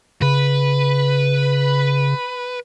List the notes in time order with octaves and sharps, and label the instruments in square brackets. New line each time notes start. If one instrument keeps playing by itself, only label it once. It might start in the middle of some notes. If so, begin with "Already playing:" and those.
[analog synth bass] C#3 [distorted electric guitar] B4